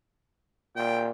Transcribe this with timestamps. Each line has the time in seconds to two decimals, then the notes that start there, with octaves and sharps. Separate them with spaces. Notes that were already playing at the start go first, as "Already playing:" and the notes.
0.76 A#2 G5